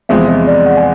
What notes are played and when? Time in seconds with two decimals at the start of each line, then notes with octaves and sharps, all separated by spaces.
0.09 E2 C3 F3 G#3 C4 E5
0.28 D#5
0.47 D5
0.66 F#5
0.77 G#5